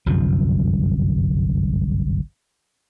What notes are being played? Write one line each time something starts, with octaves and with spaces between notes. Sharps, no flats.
G1 C2 F#2 F3